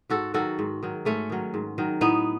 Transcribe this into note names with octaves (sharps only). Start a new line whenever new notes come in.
G#2 F#4 A4
D#3 F#3 F#4 A4
G#2
D#3 F#3
G#2 A3 C#4
D#3 F#3
G#2
D#3 F#3
A2 B3 D#4